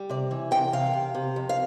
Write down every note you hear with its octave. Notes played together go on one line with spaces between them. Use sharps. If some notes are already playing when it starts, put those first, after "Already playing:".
Already playing: G3
C3 D5
E3
C3 G5
C3 F5
C3
C3
F2
F5